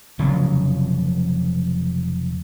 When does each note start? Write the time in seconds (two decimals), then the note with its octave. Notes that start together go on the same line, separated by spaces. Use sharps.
0.19 F1 C#3 F3 F#3